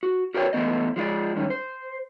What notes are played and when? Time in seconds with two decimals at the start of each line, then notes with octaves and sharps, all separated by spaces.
0.03 F#4
0.34 F#4 A#4 B4 C#5 D5 G5
0.53 E3 A3 B3 D#5
0.96 F3 G#3 F4 D5
1.36 G#2 D#3 G3 C#4
1.50 C5